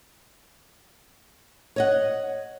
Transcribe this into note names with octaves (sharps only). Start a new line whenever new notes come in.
C#5 D#5 F#5